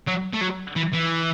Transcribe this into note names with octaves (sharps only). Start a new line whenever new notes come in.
F#3
A3
F#3
E3
E3